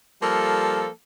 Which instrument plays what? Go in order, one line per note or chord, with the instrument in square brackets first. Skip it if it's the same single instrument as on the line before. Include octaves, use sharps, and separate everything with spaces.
[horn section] F3 G3 A#3 A4